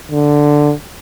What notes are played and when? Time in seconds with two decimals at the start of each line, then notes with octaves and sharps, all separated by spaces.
0.11 D3